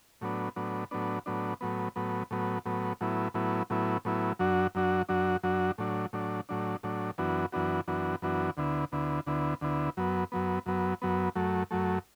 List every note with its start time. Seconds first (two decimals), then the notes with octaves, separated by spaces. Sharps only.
0.21 A2 F#3 B3 D4
0.56 A2 F#3 B3 D4
0.91 A2 F#3 B3 D4
1.26 A2 F#3 B3 D4
1.61 A2 F#3 B3
1.96 A2 F#3 B3
2.31 A2 F#3 B3
2.65 A2 F#3 B3
3.01 A2 F#3 B3 E4
3.34 A2 F#3 B3 E4
3.70 A2 F#3 B3 E4
4.05 A2 F#3 B3 E4
4.39 F#2 F#3 D4 F#4
4.75 F#2 F#3 D4 F#4
5.09 F#2 F#3 D4 F#4
5.43 F#2 F#3 D4 F#4
5.78 A2 F#3 D4
6.13 A2 F#3 D4
6.49 A2 F#3 D4
6.83 A2 F#3 D4
7.18 F#2 E3 B3 D4 F#4
7.52 F#2 E3 B3 D4 F#4
7.88 F#2 E3 B3 D4 F#4
8.22 F#2 E3 B3 D4 F#4
8.57 D2 D3 B3 E4
8.92 D2 D3 B3 E4
9.27 D2 D3 B3 E4
9.61 D2 D3 B3 E4
9.97 F#2 F#3 B3
10.32 F#2 F#3 B3
10.66 F#2 F#3 B3
11.02 F#2 F#3 B3
11.35 F#2 F#3 A3
11.71 F#2 F#3 A3